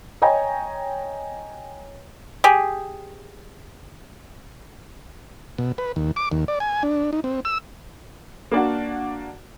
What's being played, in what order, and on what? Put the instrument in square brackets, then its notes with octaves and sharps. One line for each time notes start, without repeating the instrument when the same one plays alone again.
[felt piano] C#5 D#5 G5 G#5 A#5
[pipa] G4 G#4
[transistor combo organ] B2
B4
D#2
D6
D#2
D5
G#5
D4
D#4
C4
E6
[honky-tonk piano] A#3 D4 F#4